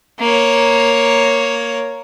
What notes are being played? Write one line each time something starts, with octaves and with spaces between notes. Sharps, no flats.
A#3 C#5